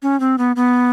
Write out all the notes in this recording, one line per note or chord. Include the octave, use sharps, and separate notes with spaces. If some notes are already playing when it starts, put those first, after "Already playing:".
C#4
C4
B3
B3